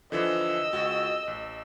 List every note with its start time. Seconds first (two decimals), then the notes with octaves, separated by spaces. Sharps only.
0.12 D3 E3 F3 D#5 E6
0.73 C#2 F#4
1.27 A1